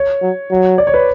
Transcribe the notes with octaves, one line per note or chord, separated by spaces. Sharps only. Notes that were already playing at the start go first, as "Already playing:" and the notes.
Already playing: C#5
F#3
F#3
D5
C#5
B4